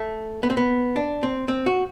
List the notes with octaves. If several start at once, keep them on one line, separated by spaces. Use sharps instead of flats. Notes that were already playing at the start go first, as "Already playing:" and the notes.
Already playing: A3
B3
C4
B3
D4
C4
C4
F#4